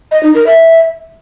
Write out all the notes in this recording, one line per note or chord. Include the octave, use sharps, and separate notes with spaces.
D#5
D#4
A#4
E5